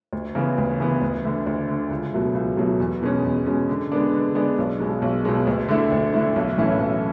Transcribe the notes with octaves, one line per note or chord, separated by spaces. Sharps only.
D2
C#3 E3 B3
D2
C#3 E3 B3
D2
D3 A3
D2
D3 A3
C#2
B2 F#3 A3
C#2
B2 F#3 A3
E2
B2 G#3 C#4
E2
B2 G#3 C#4
D3
G#3 B3 D4
D3
G#3 B3 D4
B1
B2 G#3
B1
B2 G#3
D2
D3 A3 E4
D2
D3 A3 E4
B1
A2 E3 A3 C#4
B1